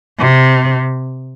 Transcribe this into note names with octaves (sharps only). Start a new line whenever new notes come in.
C3